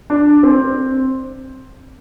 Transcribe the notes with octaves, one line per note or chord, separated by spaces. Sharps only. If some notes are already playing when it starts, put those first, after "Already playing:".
D4
C4